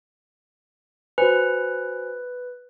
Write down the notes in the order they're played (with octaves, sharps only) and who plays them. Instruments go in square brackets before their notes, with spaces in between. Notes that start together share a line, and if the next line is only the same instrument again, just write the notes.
[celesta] F#4 C5 G#5 [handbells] B4